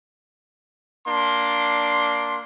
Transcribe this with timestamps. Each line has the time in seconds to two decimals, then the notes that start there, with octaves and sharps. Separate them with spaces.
1.07 A#3 D4 C6